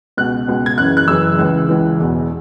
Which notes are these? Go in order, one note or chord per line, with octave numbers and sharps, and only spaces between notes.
C#2 B2 F#6
C#2 B2
G#6
F#1 F#2 C#3 E3 F#6
F#6
F#1 F#2 C#3 E3 E6
C#2 C#3 E3
C#2 C#3 E3
E1 E2 B2